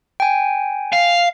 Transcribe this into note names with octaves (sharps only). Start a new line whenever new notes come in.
G5 G#5
F5